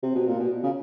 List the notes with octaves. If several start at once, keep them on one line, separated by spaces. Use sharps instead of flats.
C3
B2
A#2
B2
C#3